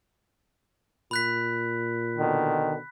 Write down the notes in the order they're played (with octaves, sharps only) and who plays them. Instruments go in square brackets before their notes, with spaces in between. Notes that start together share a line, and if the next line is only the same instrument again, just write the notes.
[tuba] A#2 [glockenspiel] B5 F#6 B6
[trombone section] B2 D3 D#3